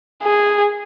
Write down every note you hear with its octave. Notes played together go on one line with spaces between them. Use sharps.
G#4